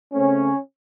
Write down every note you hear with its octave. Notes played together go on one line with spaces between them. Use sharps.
C#3 A3 C4 C#4